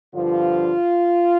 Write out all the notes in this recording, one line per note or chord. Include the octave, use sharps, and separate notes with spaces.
G2 D3 F3 F4